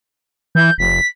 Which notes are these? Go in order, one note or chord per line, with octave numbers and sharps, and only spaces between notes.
E3 G6
F1 B6